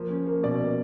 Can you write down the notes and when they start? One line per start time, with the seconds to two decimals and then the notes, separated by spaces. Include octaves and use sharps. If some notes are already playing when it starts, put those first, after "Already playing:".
Already playing: F3 A#3
0.10 C#4
0.27 A#3
0.43 B2 D5
0.60 A#3